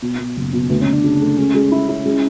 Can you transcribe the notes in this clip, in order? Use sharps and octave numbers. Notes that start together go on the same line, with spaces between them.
B2
B2
F#1
B2
D2 B3
C#4
D2
D4
C#3
A3
G#3 C#4
G#3
E4
E4
G#3